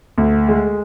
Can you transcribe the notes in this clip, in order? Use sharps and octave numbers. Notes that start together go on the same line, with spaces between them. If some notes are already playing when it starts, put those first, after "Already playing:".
D2
G#3